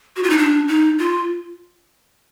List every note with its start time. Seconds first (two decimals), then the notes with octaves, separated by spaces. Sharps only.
0.16 F#4
0.23 F4
0.30 D#4
0.38 D4
0.68 D#4
0.99 F4